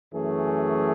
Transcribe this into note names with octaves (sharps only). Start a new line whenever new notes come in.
F#2 E3 A3 C#4 G#4